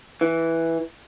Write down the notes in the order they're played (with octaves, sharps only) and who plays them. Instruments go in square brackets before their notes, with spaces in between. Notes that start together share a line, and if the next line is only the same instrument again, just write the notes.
[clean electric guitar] E3